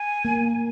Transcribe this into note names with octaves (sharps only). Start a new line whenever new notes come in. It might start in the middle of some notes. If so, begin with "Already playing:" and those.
Already playing: G#5
A#3